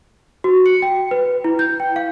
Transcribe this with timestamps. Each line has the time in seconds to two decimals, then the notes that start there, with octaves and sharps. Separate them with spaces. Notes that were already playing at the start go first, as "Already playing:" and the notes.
0.44 F#4
0.66 C#7
0.82 G5
1.11 B4
1.44 E4
1.59 G6
1.80 G5
1.96 F5